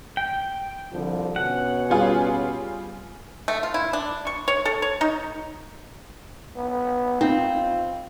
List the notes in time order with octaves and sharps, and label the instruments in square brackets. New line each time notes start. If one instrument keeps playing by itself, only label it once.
[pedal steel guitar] G5
[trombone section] C2 D3 F3
[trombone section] B2 B3 C#4 [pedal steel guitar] F#5
[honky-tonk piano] G3 F4 G#4
[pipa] A3
F4
E4
D4
C#6
C#5
A4
C#5
D#4
[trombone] B3
[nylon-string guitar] C4 [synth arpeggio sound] D#4 [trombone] F4